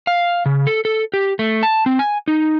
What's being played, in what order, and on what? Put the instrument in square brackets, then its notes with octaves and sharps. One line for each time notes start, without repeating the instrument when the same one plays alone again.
[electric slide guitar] F5
C#3
A4
A4
G4
A3
A5
C4
G#5
D#4